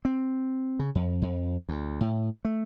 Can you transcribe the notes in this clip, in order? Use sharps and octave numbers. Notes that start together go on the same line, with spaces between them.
C4
C#3
F2
F2
D2
A2
A3